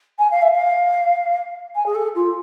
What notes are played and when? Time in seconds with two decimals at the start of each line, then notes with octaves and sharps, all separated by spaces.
0.19 G#5
0.31 F5
0.42 E5
0.52 F5
1.75 G#5
1.86 G#4
1.95 A4
2.15 F4